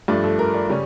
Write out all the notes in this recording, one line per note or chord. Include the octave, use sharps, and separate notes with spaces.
G2 F3 A3 D5
A4
A#4
D5
C#3 G3 C#4